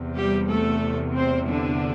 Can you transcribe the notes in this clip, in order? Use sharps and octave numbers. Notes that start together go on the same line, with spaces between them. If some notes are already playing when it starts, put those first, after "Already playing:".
Already playing: E2 C3
G3 G4
A3 A4
C4 C5
D3 D4